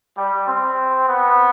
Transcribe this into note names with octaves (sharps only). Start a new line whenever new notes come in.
G3
C4
B3